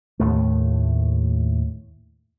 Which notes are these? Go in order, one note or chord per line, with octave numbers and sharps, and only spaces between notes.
D#2 A2 A3